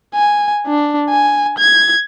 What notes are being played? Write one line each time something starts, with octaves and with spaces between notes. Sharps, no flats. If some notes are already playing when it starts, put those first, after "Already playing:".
G#5
D4
G#5
G#6